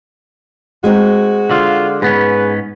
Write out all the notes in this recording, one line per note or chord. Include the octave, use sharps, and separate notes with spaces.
G#3 C4 D#4 F#4
D3 F4
G#2 B3 C#4 G#4 B4